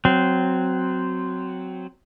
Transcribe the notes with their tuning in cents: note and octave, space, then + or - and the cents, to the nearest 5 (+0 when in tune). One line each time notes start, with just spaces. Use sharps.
F#3 +0 C4 -10